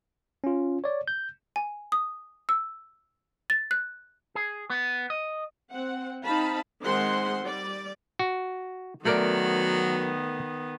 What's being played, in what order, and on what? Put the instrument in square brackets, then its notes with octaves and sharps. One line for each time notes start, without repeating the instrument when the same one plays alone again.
[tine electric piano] C#4 F4
C#5 D5
G6
[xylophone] G#5
D#6
E6
A6
F#6
[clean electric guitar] G#4
B3
D#5
[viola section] C4 F#5
C4 D#4 F5 A5 B5
D#3 G#3 C4 C5 F#5 C6
G3 D5
[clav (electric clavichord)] F#4
[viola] D#3 B3 [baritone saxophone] F#3 [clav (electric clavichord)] A3 A#4 D5